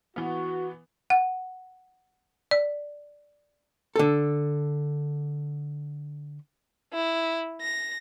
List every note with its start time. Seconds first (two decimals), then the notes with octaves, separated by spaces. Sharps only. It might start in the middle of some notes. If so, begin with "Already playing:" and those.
0.16 E3 B3 F#4
1.10 F#5
2.51 D5
3.96 D3 A4
6.94 E4
7.61 A#6